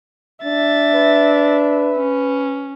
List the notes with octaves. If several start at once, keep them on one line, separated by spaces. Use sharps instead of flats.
D4 E5 A6
B4
C#4